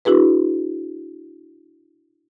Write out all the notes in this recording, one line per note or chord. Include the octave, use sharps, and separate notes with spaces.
D4 E4 F#4 G#4 B4